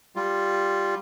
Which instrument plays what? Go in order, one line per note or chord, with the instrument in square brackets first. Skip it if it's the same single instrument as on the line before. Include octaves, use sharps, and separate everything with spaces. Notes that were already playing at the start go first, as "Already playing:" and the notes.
[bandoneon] G3 F4